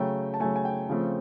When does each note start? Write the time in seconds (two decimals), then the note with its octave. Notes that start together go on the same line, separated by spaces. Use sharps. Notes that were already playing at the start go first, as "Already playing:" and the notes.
Already playing: C#3 F#3 A3 G5
0.34 A5
0.40 C#3 F#3 A3 G#5
0.56 G#5
0.65 G5
0.89 C#3 F3 A3 C4